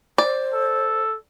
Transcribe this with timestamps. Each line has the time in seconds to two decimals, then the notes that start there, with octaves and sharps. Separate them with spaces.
0.18 C5 D5
0.54 A4